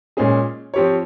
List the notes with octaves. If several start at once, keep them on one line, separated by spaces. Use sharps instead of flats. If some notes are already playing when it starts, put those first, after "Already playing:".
A#2 G#3 C#4 G#4
F3 C4 G4 C#5